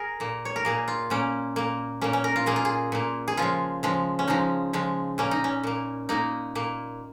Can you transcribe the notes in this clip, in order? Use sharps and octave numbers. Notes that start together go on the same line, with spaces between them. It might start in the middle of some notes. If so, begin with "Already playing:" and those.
Already playing: G#4 A#4
A#2 A#3
C#5
A#4
A#2 A#3 G#4
F4
A#2 A#3 C#4
A#2 A#3
A#2 A#3 C#4
C#4
A#4
F4
A#2 A#3 G#4
F4
G#4
A#2 A#3
G#4
C#3 F3 G#3 F4
C#3 F3 G#3
C#4
C#3 F3 G#3 D#4
C#3 F3 G#3
A#2 A#3 C#4
D#4
C#4
A#2 A#3
A#2 A#3 D#4
A#2 A#3